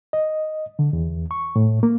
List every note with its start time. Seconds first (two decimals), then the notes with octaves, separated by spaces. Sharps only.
0.13 D#5
0.79 D3
0.93 E2
1.31 C#6
1.56 A2
1.83 A#3